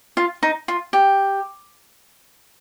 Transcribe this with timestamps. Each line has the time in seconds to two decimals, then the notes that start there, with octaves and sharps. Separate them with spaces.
0.17 F4
0.43 D#4
0.68 F4
0.93 G4